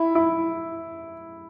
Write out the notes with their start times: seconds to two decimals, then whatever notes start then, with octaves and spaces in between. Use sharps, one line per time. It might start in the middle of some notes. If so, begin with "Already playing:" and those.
Already playing: E4
0.15 E4